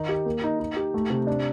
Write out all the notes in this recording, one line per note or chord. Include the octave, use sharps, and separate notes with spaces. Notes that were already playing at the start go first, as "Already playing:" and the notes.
Already playing: D#3 D#4
G4
A#3
D#4
D#4
G4
A3
C3
D4